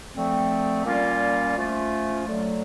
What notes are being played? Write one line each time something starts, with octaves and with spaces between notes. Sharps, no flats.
D3 F3 A3 C4
A#2 G3 A#3 C#4 F4
F3 A3 C#4 F4
D3 F#3 A3